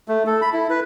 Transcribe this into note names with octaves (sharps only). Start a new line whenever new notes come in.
A3
A4
B5
E4
B4